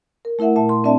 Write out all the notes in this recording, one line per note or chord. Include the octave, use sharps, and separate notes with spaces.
A#4
A3 E4 A#4 E5 F#5
A#2 E5 A5
C6
C4 D4 D5 E5 A5